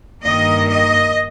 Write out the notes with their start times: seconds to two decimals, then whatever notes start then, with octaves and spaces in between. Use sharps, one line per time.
0.23 G2 D#3 A#3 D#5
0.68 D#5